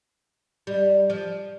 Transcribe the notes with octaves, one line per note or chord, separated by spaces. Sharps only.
G3
F3